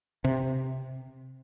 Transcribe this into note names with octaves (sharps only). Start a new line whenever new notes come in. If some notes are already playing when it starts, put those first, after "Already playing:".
C3